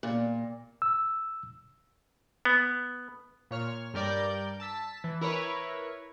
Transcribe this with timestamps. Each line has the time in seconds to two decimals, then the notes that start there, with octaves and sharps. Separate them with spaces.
0.03 A#2
0.82 E6
2.45 B3
3.51 A#2 C#5 F6
3.94 G2 G3 A#4 D5 G6
4.60 A5 E6 B6
5.04 E3
5.21 E4 A#4 B4 C#5